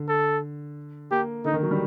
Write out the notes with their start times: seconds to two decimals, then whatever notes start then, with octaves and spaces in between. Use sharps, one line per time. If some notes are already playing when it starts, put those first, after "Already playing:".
Already playing: D3
0.09 A4
1.11 A#3 G4
1.45 D3 D#4
1.53 D#3
1.63 F#3
1.71 G3